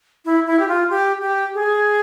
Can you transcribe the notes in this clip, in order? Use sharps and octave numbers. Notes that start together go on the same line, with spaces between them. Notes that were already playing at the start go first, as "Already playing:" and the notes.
E4
E4
G4
F4
G4
G4
G#4